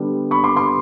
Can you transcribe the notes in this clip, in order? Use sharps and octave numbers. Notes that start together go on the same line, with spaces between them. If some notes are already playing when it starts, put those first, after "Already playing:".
Already playing: D3 G3 B3 D4
B5 C#6
C6 D6
C6 D6